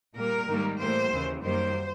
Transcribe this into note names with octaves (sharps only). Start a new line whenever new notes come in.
A#2 G3 A#3 A#4
G#2 D#3 G3 A#3
A2 E3 G3 A#3 C5
D#2 C#3 E3
F#2 D#3 G3 A#3 C5